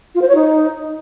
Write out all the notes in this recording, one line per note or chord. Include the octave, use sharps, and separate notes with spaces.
F4
C5
C#5
D#4